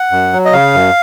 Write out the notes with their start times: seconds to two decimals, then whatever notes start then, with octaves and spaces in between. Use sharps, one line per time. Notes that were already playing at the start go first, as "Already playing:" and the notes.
Already playing: F#5
0.11 F#2
0.33 F#3
0.45 D#5
0.53 C#3 F5
0.75 F#2